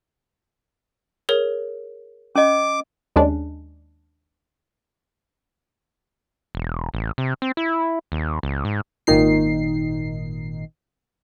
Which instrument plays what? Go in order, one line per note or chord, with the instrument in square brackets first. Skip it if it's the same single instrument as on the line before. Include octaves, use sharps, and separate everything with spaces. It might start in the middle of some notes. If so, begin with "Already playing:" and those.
[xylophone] G#4 A#4 C#5
[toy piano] C#4 D#5 [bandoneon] D6
[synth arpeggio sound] D#2 G#3 C#4 D4
[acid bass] E1
A1
C3
C4
E4
D#2
C#2
G#2
[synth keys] G#1 A#2 D#3 D#4 C7